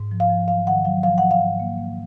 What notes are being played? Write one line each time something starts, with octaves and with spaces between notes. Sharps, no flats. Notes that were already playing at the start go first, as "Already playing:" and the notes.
Already playing: G#2
F3
F5
F3
F#3 F5
D#3 F#5
F#3 F5
F3 F5
F3 F#5
F5
G#2
A#3
A#3